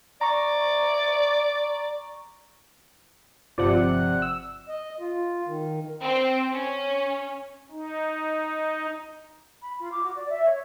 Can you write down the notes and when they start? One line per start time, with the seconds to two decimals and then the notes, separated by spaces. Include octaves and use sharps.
0.21 D5 A#5 C#6
3.58 G1 C3 F3 D5 F#5
4.22 E6
4.68 D#5
5.00 F4
5.46 D#3
6.02 C4 G5
6.53 C#4
7.71 D#4
9.62 B5
9.80 F4
9.92 D6
10.03 F#4
10.16 D5
10.29 E5
10.46 C#5